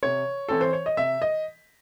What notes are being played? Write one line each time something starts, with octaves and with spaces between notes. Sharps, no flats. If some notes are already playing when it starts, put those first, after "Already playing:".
C3 C#5
E3 C4 A4
C5
C#5
D#5
C3 E5
D#5